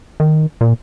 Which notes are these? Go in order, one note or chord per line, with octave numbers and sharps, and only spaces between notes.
D#3
A#2